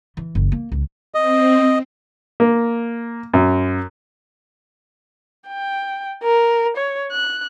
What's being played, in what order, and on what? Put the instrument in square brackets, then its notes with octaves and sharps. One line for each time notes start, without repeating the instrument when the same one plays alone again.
[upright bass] E3
F#1
A#3
C#2
[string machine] C4 [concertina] D#5
[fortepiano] A#3
F#2
[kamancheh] G5
A#4
C#5
F#6